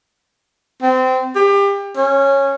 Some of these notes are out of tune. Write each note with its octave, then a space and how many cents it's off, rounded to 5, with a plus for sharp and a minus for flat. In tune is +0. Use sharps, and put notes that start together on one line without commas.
C4 -25
G4 +30
C#4 -10